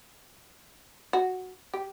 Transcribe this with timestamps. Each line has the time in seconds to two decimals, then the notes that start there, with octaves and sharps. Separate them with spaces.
1.13 F#4
1.74 G4